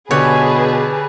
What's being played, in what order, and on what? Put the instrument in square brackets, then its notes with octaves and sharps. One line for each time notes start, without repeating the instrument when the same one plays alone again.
[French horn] B2 [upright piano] D3 G4 G#5 [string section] G#4 B4 A5 [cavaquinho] C#5